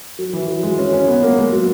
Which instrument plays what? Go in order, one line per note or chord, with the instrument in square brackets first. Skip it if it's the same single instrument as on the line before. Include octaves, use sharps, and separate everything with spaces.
[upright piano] F#3
E3
F#3
G#3
C#4
C#4
B3
A#3
G#3
F#3